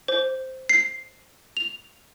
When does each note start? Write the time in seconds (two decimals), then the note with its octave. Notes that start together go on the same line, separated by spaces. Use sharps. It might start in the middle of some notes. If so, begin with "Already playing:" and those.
0.08 C5
0.69 C7
1.57 F7